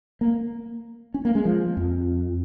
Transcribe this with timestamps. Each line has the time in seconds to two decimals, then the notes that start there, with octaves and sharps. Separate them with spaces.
0.21 A#3
1.14 C#4
1.25 A#3
1.35 G#3
1.45 F3
1.77 F2